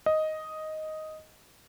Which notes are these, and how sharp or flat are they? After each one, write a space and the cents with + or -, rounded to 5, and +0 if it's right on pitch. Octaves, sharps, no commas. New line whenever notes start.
D#5 +5